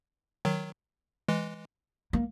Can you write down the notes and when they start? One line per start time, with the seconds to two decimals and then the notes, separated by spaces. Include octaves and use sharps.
0.45 D#3 F#3
1.28 E3 G#3
2.13 A#3